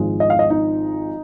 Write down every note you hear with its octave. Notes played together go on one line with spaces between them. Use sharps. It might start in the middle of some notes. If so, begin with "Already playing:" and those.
Already playing: G#1 G#2 F3 G#3
D#5
F5
D#5
D#4